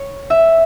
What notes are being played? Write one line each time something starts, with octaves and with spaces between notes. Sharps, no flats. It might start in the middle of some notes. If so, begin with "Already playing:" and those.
Already playing: C#5
E5